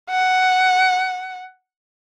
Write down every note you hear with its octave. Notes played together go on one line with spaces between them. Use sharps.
F#5